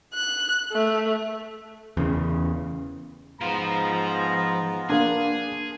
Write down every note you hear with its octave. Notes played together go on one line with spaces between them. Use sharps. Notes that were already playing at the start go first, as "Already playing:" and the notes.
F#6
A3
E2 C#3
G#2 F3 B3 F4 F5 A#5
A#3 D4 G#4